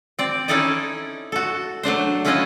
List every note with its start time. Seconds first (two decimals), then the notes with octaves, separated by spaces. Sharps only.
0.19 C4 D5
0.48 C#4 D#4 E4 A4 D5 D#5
1.32 F#4 A4
1.83 F#3 A3 D4 C5
2.25 A3 C#4 E4 F4 B4 D#5